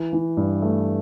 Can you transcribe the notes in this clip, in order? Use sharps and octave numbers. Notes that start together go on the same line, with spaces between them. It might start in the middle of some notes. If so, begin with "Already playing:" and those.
Already playing: E3
E3
G2
A3